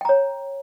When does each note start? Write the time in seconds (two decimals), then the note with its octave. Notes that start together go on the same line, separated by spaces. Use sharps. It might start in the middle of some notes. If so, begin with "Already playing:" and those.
0.01 G5
0.05 A#5
0.09 C#5